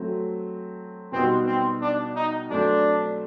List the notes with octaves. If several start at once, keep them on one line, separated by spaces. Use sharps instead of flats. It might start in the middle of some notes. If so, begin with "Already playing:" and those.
Already playing: F#3 A3 C4
B2 G3 B3 C4 D#4 F#4
C4
D4
D#4
F#3 A3 C4 D4